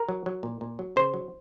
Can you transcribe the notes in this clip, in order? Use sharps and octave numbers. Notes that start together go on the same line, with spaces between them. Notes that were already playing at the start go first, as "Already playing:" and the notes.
Already playing: A#4
F#3
F#3
A#2
A#2
F#3
C#3 C5
F#3